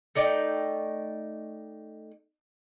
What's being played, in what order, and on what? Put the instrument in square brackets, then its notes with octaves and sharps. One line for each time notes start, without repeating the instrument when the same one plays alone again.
[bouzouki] A3 D#4 D5 G5